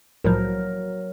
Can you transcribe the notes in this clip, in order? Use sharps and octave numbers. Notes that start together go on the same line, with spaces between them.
C2 A2 F3 F#3 A#4